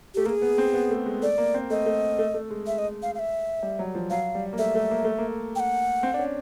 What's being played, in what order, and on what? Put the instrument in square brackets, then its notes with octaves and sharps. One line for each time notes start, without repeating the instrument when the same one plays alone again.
[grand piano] A3 [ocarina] G4
[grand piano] A#3 [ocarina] A#4
[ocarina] G#4
[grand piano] B3
C4
B3
A3
G#3
[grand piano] A3 [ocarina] D5
[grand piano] A#3
C4
[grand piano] A3 [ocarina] D#5
[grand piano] A3
A3
A3
G#3
[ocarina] E5
D#5
F5
F5
E5
[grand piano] G3
F#3
F3
[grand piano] F#3 [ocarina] F5
[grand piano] G3
A#3
[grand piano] A3 [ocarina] E5
[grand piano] A3
A#3
A3
A#3
[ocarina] G5
F#5
[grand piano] C4
D4
C#4